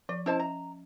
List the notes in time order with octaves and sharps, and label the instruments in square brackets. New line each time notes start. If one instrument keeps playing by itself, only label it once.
[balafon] F3 [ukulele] D5
[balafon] C#4 D#5 E5 [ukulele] E4 C5 A5
[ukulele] A#5